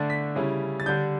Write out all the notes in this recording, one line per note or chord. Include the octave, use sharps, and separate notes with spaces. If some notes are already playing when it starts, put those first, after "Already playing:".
Already playing: D3 A3 D4 A6
B6
C#3 G3 C#4 E4
A6
D3 G3 D4 G6